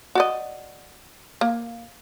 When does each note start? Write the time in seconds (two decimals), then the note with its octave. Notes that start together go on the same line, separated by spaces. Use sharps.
0.15 F#4 D5 D#5
1.41 A#3